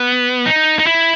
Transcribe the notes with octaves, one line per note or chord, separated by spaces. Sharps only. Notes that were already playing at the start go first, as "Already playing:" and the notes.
Already playing: B3
D#4
D#4
E4